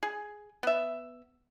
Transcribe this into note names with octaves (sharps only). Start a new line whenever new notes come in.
G#4
B3 E5